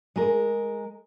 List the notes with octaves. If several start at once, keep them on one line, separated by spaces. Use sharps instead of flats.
G#3 A#4